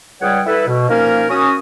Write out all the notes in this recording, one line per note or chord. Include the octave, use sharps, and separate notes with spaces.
C#2 G3 G#4 C#5 F#5 G5
E4 A4 B4
B2
F3 A#3 C#4 D#4 A#4
C#4 F#4 D#6